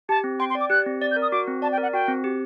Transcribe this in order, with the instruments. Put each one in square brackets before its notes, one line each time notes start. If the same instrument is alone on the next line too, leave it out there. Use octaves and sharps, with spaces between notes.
[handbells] G4 [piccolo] A5
[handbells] C4
[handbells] G5 [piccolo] C6
[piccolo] C6
[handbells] D5
[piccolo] D6
[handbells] G4 [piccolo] F#6
[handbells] C4
[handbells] D5 [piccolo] A6
[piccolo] G6
[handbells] A#4
[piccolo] D#6
[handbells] F#4 [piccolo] D6
[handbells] C4
[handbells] D5 [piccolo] A5
[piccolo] G5
[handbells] A#4 [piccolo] F#5
[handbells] F#4 [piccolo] G5
[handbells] C4
G4